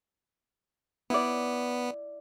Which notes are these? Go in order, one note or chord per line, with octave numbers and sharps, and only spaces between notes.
B3 E4 D5